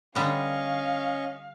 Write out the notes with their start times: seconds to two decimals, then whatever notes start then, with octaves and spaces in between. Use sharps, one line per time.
0.15 D3 G3 B3 C#4 D#5 F5 C#6